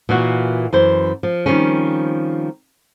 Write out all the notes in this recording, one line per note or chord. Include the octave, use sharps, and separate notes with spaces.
A#2 E3 A#3 F#4
F#2 E3 C5
F3
D#3 F3 G3 C4 C#4